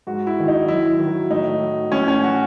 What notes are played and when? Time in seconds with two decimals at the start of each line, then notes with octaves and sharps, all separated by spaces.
0.07 G#2 F#4
0.27 E4
0.38 D#3 F#3
0.48 D#4
0.68 F#2 E4
0.99 D#3 F#3
1.31 A2 D#4
1.61 F#3
1.92 A2 C#4
2.08 C#4
2.23 F#3 F#4